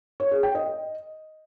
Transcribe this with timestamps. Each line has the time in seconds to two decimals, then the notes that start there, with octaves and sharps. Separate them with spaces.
0.20 C#5
0.31 G#4
0.43 G5
0.55 D#5